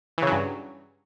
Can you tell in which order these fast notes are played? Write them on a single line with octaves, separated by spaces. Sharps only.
E3 C#3 F#3 G2